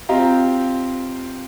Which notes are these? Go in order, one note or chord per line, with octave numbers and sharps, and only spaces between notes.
C4 F4 G4 D#5 F5 A#5